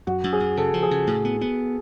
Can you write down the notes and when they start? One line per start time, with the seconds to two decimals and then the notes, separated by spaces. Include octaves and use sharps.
0.07 F#2 F#4
0.24 F#2
0.33 G#4
0.40 F#2
0.57 C#3 A4
0.74 F3
0.83 G#4
0.91 C#3
1.07 A2
1.25 B3
1.41 B3